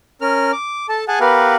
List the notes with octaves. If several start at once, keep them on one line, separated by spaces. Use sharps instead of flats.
C#4 A#4 F6
D6
A4 A5
G#4 F#5 G#5 A5
B3 G4 A#4 B4 F5 F#5